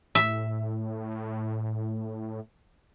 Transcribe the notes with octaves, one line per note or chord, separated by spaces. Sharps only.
A2 E5